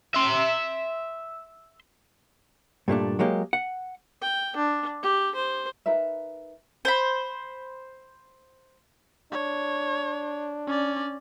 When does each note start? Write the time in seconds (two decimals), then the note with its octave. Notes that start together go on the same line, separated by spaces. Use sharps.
0.14 E5 C6
2.88 G2 A#2 A3 D4
3.19 F#3 G#3 A#3 G4
3.53 F#5
4.21 G5
4.56 D4
5.02 G4
5.35 C5
5.86 D#4 A#4 B4 E5
6.85 C5 B5
9.32 D4 C#5
10.67 C#4 D5